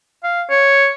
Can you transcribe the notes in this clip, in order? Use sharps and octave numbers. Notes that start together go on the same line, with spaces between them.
F5
C#5